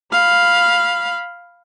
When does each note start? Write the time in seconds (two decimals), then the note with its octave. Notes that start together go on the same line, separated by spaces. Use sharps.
0.12 F5 B5